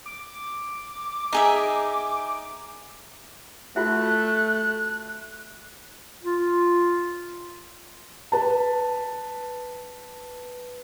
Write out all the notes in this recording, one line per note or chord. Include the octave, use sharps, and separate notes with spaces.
D6
D#4 G#4 E5
A3 F4 F#4 E5 F#6
F4
B4 A5